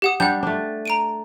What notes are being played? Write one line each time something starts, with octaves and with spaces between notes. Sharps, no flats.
G4 F#5 D#6
G3 D4 F#5 G6
A3 D4
A#5 D7 D#7